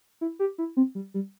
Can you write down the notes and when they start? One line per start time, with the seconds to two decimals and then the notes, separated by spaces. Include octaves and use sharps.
0.21 E4
0.39 G4
0.58 E4
0.77 C4
0.95 G3
1.14 G3